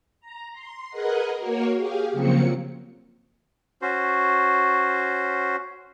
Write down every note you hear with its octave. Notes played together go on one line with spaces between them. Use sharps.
A#5
C6
G#4 A#4 B4 D#5 F#5
A#3 F#4 A#4 C#5
G4 G#4 F5
C#3 F3 F#3 A#3 C4 C#7
C#4 F#4 C5